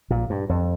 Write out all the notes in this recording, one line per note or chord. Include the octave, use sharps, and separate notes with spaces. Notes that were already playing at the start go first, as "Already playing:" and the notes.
A#1 A#2
G2
F2